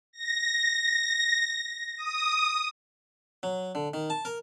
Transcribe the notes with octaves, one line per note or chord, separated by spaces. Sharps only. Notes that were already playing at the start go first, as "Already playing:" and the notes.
A#6
D#6
F#3
D3
D#3
A5
A#4